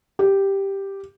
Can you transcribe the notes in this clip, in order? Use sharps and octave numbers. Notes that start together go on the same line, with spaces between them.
G4